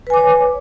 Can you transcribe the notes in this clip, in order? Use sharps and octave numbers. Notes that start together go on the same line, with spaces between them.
B4 C#5 G#5 D6